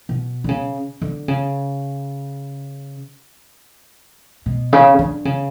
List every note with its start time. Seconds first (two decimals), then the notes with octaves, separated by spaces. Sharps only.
0.09 B2
0.44 D3
0.49 C#3
1.02 D3
1.28 C#3
4.46 B2
4.73 C#3
4.99 D3
5.25 C#3